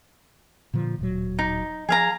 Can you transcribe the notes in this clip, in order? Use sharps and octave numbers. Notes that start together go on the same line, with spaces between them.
A#2 D3 F3
D1 A#2 F#3
D#4
F3 G#4 F5 A#5